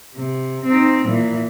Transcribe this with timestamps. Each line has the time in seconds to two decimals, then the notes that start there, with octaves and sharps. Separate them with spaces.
0.15 C3
0.65 C4 D#4
1.06 A#2 E3